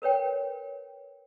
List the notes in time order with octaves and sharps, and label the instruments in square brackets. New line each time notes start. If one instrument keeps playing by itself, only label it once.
[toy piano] A#4 B4 C#5 G5